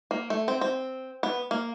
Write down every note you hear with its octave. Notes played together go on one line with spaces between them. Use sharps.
A#3
A3
C4
C4
B3
A#3